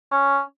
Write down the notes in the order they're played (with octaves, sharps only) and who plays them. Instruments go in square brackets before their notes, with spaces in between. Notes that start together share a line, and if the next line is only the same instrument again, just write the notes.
[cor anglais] C#4